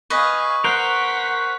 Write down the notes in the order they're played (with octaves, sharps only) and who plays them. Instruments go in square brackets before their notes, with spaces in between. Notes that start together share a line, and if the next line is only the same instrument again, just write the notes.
[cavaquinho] B4 D#5 [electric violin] F5 G#5 [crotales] C#6 B6
[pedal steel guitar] A#4 C5 [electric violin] F#5 B6 [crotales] F#6